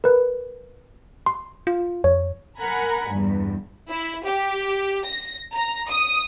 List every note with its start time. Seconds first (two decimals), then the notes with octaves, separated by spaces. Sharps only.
0.04 A#4 B4
1.26 C6
1.67 F4
2.04 F2 C#5
2.58 A#4 F#5 G#5 A#5 B5
3.09 E2 G2
3.88 E4
4.25 G4
5.05 A#6
5.54 A#5
5.88 D#6